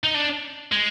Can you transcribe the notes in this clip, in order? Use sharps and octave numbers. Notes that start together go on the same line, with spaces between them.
D#4
D4
G#3